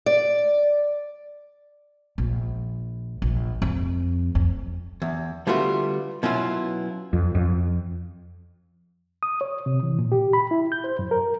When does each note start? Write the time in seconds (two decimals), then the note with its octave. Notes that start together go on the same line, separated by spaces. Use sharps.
0.06 D5
2.18 A#1
3.22 A#1
3.62 F2
4.35 F2
5.02 E2
5.47 D3 G3 A3 B3 F4 F#4
6.23 B2 F#3 C#4 E4 F4
7.13 F2
7.35 F2
9.23 D#6
9.41 C#5
9.66 C3
9.83 E3
9.99 A#2
10.12 G4
10.33 B5
10.51 E4
10.72 G6
10.84 C5
10.99 F#2
11.11 A#4